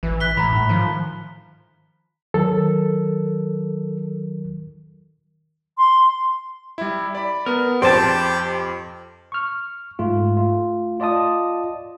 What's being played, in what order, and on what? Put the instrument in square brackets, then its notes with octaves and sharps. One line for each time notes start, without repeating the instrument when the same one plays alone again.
[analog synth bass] A1 [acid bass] E3
[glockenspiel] F#6 B6 G7
[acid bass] A2 [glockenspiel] A#5 B5
[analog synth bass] G#2
[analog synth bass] D#3 [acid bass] F3
[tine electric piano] D#3 F#3 A#4 [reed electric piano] A4
[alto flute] C6
[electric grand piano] G3 E4
D5 B5
[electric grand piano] B3 [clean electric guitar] A#4
[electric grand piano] F2 [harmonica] G4 [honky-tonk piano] C5 [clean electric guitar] G5 A5
[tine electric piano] C#6 F6
G#2 A3 F4
A3 F4
F4 D5 D#5 A5 D#6